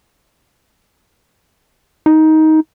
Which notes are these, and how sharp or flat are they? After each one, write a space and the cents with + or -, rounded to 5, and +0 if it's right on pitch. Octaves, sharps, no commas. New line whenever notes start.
D#4 +15